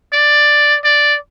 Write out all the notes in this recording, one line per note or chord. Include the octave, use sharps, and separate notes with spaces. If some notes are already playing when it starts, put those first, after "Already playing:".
D5
D5